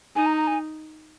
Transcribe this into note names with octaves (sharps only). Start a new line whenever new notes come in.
D#4 G#5
A#5
A#5
G#5